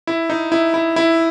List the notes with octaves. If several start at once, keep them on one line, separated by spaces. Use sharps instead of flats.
E4
D#4
E4
E4
E4